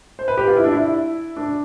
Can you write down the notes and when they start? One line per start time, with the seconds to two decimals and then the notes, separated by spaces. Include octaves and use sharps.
0.19 C5
0.28 B4
0.37 G4
0.48 F4
0.56 E4
0.64 D4
0.73 E4
1.37 D4